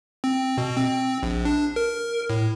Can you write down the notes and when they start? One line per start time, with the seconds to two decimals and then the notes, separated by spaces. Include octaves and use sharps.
0.24 C4
0.58 B2
0.77 C4
1.23 A#1
1.45 D4
1.76 A#4
2.30 A2